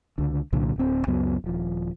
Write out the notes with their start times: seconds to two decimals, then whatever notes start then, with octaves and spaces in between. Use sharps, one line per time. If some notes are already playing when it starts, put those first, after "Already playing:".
0.18 C#2 D3
0.53 C2 A#2 D3 F#3
0.76 D1 C4
1.07 C#2 F#2 F#3 B3
1.44 D#1 F3